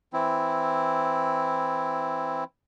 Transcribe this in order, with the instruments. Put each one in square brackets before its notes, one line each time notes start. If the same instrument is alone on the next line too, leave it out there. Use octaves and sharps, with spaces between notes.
[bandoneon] E3 C4 E4